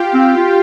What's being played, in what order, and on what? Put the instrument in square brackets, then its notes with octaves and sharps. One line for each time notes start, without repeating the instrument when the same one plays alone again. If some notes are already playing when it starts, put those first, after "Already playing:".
Already playing: [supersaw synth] F4 G4 F5 G5
[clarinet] C4
F4